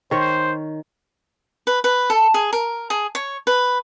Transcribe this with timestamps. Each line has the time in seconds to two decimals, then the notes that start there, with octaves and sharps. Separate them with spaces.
0.11 D#3 C5 C#5
1.67 B4
1.84 B4
2.10 A4
2.34 G#4
2.53 A#4
2.90 G#4
3.15 C#5
3.47 B4